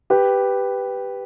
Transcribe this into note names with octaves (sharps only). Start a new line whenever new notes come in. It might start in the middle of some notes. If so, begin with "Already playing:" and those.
G4 B4